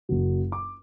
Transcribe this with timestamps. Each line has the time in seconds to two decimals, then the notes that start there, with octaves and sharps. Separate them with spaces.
0.09 F#1 F#2 C#3 F#3
0.52 D6